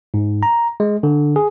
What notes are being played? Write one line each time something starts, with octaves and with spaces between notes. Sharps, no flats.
G#2
A#5
G#3
D3
G#4